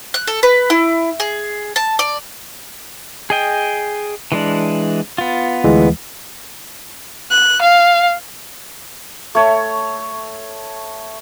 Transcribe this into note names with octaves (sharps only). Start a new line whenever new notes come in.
F#6
A4
B4
E4
G#4
A5
D5
G#4 D#5 G5
E3 G#3 D4
B3 F4
D2 E3 G#3
F#6
F5
A3 C#5